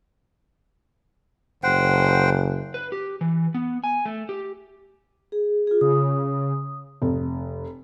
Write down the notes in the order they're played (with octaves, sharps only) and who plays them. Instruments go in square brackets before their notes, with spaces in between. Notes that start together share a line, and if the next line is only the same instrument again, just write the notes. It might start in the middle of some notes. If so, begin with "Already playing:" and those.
[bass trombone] F#1 [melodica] C5 F#5 G5
[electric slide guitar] B4
G4
E3
B3
G#5
A3
G4
[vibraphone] G#4
F4 G#4
[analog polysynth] C#3 [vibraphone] D#6
[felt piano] F1